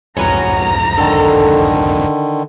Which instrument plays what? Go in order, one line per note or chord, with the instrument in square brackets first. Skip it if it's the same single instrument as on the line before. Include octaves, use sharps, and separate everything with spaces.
[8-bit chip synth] C2 F2 G#2 [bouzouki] F#3 B3 C#4 [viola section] A#5
[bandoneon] D3 D#3 [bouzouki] A4